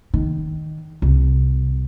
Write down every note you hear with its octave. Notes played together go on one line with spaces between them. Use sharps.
D#3
C2